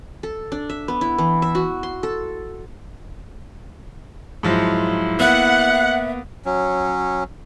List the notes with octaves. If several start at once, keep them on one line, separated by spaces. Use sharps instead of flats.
A4
D4
E5
B3
E4
E3
E5
F#4
C6
A4
G#2 F3 F#3 E4
A#3 B3 E5 F#5
F#3 C#4